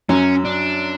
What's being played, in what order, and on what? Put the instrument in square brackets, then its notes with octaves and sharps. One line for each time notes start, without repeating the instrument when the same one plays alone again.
[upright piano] F#2 F#3 [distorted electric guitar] C#4
[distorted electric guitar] D4